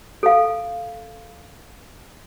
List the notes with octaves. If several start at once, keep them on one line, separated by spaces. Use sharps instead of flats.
A4 F5